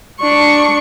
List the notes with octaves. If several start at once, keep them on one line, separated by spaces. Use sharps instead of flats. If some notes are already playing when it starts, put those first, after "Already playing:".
D4 C#6